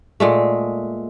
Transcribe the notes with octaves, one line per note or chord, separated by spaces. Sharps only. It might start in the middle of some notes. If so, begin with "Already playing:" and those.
A#2 G#3 A3